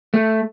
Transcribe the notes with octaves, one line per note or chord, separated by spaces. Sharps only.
A3